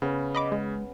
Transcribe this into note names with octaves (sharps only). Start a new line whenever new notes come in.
C#3 B3 C#4 G#4
D#5 B5 D6
G#3